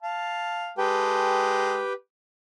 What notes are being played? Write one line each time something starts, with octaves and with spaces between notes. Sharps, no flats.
F5 A5
G#3 G4 A4 B4 G5